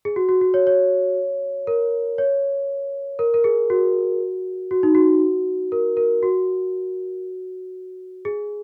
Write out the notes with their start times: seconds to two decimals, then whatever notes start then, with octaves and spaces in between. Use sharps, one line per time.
0.05 G#4
0.16 F#4
0.29 F#4
0.41 F#4
0.54 C#5
0.67 C#5
1.67 A#4
2.18 C#5
3.19 A#4
3.34 A#4
3.44 G#4
3.70 F#4
4.71 F#4
4.83 D#4
4.95 F#4
5.72 A#4
5.97 A#4
6.23 F#4
8.25 G#4